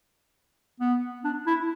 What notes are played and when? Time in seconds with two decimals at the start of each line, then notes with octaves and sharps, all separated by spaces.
0.80 B3
1.24 D4
1.47 E4